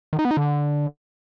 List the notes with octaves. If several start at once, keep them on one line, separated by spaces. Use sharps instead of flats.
D#3
D#4
B3
D#4
D3